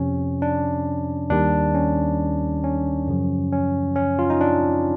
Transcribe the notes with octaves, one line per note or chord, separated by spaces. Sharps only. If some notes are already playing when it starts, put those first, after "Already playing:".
Already playing: F2 C3 F3 C#4
D4
D#2 D#3 G3 D4
C#4
C#4
F#2 C#3 F3
C#4
C#4
F4
D#4
D4